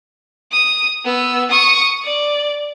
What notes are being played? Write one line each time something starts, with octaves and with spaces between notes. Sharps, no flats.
D#6
B3 E6
C#6 D#6
D5